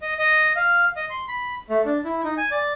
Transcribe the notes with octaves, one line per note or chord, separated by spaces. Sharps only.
D#5
D#5
F5
D#5
C6
B5
A3
D4
E4
D#4
G#5
D5